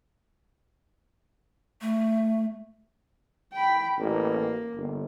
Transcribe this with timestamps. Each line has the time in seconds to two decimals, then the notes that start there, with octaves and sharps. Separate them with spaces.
1.81 A3
3.53 G5 B5
3.98 A1 A#3
4.76 G1